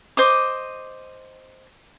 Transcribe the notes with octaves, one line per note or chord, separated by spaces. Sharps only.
C5 D#5 D6